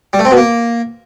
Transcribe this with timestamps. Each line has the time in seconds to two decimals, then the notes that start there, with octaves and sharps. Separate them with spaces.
0.13 G3
0.19 A3
0.25 C4
0.31 B2
0.37 A#3